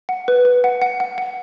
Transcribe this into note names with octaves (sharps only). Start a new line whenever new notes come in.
F#5
B4
B4
F#5
F#5
F#5
F#5